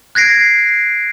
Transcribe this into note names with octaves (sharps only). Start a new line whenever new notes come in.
F#6 G#6 A#6 C7 D7